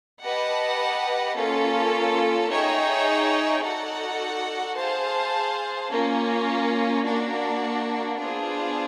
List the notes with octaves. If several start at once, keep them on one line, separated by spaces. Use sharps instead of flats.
G4 B4 D#5 F#5 A5
A#3 C#4 F4 A4
D#4 G#4 C#5 E5 G5
D#4 F#4 A4 D5 F#5
G#4 C5 F5 A5
A#3 C#4 F4
A#3 D4 F#4
B3 D4 F4 G#4 C5